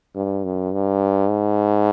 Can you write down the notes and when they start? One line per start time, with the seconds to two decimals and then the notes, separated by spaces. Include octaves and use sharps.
0.16 G2
0.44 F#2
0.73 G2
1.29 G#2